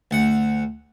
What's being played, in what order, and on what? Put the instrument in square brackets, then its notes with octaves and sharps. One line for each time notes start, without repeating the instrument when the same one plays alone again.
[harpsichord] D2 F#5